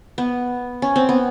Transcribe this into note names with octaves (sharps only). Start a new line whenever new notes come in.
B3
C#4
C4
B3